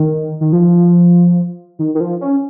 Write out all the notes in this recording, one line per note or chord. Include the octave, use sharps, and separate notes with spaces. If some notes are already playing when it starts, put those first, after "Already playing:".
Already playing: D#3
D#3
F3
D#3
D#3
F3
C#4